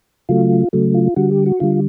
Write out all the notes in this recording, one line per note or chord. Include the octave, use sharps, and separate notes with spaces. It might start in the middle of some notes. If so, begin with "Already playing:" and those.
C#3 F#3 A3 F4
C#3 F#3 A3
F4
D3 G3 F#4
G4
F#4
D3 G3 F4